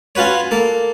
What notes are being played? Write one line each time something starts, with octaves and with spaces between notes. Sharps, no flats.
C#4 F4 F#4 B4 C#5
A#3 A4